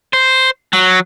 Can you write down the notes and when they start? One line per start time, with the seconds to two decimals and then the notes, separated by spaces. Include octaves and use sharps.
0.13 C5
0.73 F#3